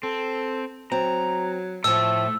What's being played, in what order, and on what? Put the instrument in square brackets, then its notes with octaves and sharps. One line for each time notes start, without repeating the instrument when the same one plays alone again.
[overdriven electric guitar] C4 [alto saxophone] A4
[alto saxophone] F#3 [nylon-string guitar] C4 [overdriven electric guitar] A#5
[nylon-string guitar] A2 F3 [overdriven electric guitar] A3 A4 [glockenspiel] E6